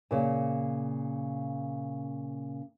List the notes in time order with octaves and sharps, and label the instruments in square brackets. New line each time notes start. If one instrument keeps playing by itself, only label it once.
[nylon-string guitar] A#2 C#3